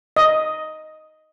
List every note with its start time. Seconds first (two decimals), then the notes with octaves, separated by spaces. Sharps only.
0.17 D#5